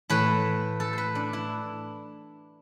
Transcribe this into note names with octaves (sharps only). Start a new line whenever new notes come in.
A2 E3 A3 B4
A4
B4 C5
D4
E4